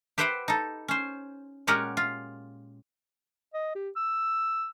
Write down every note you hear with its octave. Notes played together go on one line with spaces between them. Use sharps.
G4 B4 C5 E5 F#5 G5
D#4 A4
C#4 C5
A#2 G#3 C#4 G4 A#4 F#5
F4
D#5
G4
E6